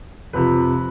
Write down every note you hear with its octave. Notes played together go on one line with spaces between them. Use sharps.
F2 C3 F3 B4